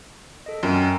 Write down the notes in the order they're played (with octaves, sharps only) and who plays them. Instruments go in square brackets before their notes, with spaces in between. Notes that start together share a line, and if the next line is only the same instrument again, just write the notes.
[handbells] A4 D#5
[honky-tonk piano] F#2 [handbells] A#4 G5 G#5
[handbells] A#5